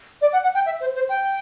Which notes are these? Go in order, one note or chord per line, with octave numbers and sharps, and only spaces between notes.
D5
F#5
F#5
G5
E5
C5
C5
G5